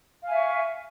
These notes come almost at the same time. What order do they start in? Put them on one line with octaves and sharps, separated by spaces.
F5 G#5 E5 C#6